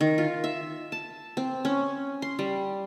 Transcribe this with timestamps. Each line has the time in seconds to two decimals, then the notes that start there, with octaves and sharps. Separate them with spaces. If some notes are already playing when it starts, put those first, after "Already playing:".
0.01 D#3
0.18 F4
0.44 E5
0.92 A5
1.37 C4
1.65 C#4
2.22 C6
2.39 G3